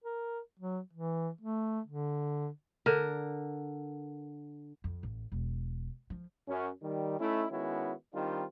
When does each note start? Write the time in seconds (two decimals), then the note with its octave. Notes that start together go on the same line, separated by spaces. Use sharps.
0.04 A#4
0.59 F#3
0.93 E3
1.41 A3
1.87 D3
2.86 D3 A#4
4.84 F2
5.03 A1
5.32 E1
6.10 F3
6.48 F#2 C#4
6.83 D#3 G3
7.20 A3 C#4 D#4 E4
7.52 D#3 G#3 B3 C#4 E4 F#4
8.14 D#3 G3 C4 D4 D#4 F4